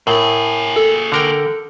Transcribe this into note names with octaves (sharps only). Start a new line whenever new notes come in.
A2 A#3 G#4 A#4 F#7 G7
A4
D3 A#4 G5